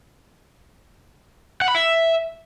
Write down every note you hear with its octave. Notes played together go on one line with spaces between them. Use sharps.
F#5
B5
E5